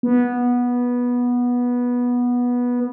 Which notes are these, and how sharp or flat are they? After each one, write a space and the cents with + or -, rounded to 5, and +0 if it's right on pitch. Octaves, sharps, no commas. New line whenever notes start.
B3 -15